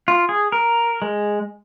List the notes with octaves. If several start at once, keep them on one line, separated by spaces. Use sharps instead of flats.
F4
G#4
A#4
G#3